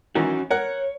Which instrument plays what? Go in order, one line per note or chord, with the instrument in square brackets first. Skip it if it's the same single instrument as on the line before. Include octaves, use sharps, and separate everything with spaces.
[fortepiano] D#3 E3 [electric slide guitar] C#4 F#4
[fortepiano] A#4 F#5 [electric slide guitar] C#5